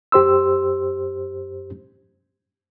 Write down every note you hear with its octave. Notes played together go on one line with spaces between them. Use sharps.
F#2 G4 C5 C6 E6